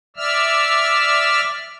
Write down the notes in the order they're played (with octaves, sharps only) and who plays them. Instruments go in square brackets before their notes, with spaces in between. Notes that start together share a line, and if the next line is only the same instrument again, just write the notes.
[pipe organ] D5 E5 E6 F6